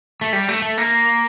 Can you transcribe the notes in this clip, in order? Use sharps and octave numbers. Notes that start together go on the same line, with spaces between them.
A3
G3
A3
A3
A#3